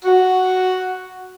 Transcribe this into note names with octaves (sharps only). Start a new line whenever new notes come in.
F#4